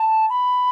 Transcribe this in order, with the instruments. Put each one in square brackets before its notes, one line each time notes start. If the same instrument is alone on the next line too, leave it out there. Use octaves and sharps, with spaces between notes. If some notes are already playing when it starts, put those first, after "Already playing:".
Already playing: [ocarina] A5
B5